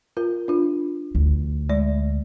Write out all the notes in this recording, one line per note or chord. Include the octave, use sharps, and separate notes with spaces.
F4 A#4
D4 F4
D2
G#3 D5